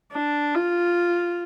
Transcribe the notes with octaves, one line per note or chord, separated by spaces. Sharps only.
D4
F4